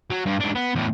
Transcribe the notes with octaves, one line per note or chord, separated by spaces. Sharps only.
F#3
G2
G#2 D4
B3
E2 A2